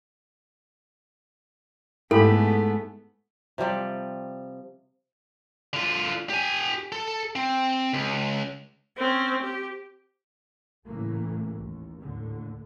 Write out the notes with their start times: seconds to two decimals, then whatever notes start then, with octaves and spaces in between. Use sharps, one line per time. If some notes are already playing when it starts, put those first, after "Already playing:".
2.11 G#2 A3 B3 E4 G4 A4 B5
3.58 C3 F3 G3 D5
5.73 D3 F4
6.30 G4 G#5
6.92 A4
7.36 C4
7.93 C#2
8.98 C4 C#4
9.42 G4
10.85 A2 C#3 E3 A3 A#3
11.57 A1 D#2
12.00 D#2 A2 D3